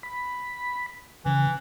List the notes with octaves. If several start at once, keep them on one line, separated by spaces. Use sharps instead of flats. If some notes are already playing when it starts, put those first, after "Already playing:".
B5
C#3 E3